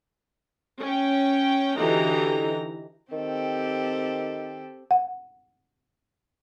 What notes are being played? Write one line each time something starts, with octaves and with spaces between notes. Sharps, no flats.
C#4 G5
D3 E3 D#4 F#4 G4 A#5
D#3 C4 G4 A4
F#5